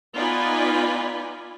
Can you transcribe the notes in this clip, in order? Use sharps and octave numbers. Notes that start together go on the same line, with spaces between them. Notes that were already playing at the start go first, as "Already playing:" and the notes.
B3 D#4 F4 D5 G#5 B5